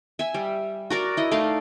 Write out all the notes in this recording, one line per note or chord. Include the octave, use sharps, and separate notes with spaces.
E5 G#5
G3
F#4 A#4 D5
E4 D#5
A3 D#4 D5 F5